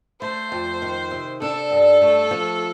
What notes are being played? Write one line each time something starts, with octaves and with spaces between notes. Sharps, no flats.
A3 C5
F2
D#3
C3
D4 A4
G2
A3
F3